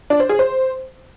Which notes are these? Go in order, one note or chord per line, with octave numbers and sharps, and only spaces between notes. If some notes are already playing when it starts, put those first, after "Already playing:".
D4
C5
G#4
C5